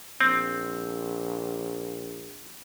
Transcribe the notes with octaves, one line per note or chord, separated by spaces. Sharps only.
A#1 C4